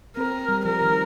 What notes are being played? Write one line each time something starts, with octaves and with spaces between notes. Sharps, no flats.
C4 A#4
G3
F3 A#4
D#3